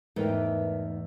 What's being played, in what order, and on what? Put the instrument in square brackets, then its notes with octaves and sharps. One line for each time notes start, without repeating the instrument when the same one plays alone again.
[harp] E2 A3 [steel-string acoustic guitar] G#2 [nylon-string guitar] B3 A#4 G5